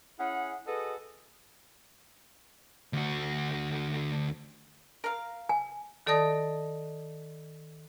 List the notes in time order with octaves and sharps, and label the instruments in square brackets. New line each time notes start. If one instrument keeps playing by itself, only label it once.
[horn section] C#4 E4 G#4 F#5
F#4 G#4 A4 B4 D#5
[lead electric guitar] D2 F#4
[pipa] A#4 F5
[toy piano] G#5
[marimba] D#3 A4 D5 A5 D#6 A#6